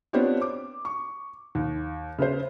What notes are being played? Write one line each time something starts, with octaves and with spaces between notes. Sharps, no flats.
B3 C4 D4 F4 G4 C#5
D6
C#6
D#2
C#3 B4 C5